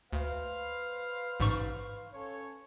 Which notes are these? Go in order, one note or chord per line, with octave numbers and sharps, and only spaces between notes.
D2 B4 C5 F5
A1 G#2 C#6
C#4 A4 C#5